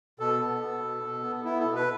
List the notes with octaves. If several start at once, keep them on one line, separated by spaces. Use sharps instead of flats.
B2 A4
B3
B3
B2
B2
B3
B3 E4
A4
B2
B4